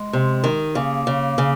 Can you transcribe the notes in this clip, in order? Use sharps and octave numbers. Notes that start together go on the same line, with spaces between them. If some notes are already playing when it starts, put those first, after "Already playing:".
Already playing: G#3
C3
D#3
C#3 A#3
C#3
C#3